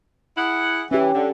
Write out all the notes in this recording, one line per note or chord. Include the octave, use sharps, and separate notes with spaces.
E4 G#4 F#5
E3 C#4 G4
D3